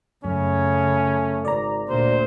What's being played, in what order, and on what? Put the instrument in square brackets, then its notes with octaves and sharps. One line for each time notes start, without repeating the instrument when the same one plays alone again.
[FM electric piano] F#2 [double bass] C#3 [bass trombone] A3 [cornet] C#4
[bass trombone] G#1 [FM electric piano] D5 A#5
[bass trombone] D2 [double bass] A#2 [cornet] C5